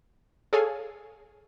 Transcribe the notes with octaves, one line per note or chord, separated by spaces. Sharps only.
G#4 A4 C#5 F5 G#5